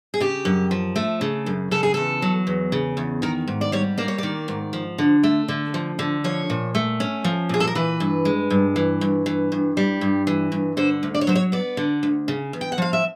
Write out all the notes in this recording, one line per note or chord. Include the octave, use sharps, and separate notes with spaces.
G#4
C#3 G4
F#2
F3
A3
C#3
F#2
C#3 A4
G#4
E2 A4
F#3
E2
C#3
E2
D#3 A#4
G#2
D5
G3 C#5
A#3 D5
C#5
D#3 D5
G#2
F3
D3
A3
D3
F3
D3
F3 C#5
A#2
A3
C#4
F3
A#2 G#4
A4
A#4
E3 B4
G2
G#3
G2
E3
G2
E3
G2
G3
G2
E3
G2
D3 C5
D2
D5
C#5
F#3 C5
C#5
B3 D5
D3
D2
C#3
E2
G5
F#5
F3 F5
E5